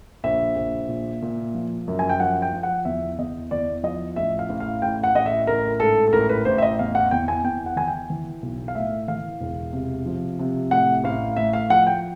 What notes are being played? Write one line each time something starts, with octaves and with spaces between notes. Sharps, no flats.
A#1 E5
A#1
A#2
A#2
F3
F#2
G#5
G5
F3 F#5
G5
F3
F#5
E2 E5
E2 D#5
E2 D5
F3 D#5
A1 E5
F5
A1
F5
A1 G5
F#5
A1 D#5
E5
A1 A#4
G#2 A4
A4
A1 A#4
B4
A1 C5
E5
D#5
E2 F5
F#5
E2 G5
G#5
E2 G5
F#5
E3 G#5
G5
E3
B1
F5
A2 E5
E3 F5
E1
C3
F3
C3
A2 F#5
A1 F5
A2 E5
F5
F3 F#5
G5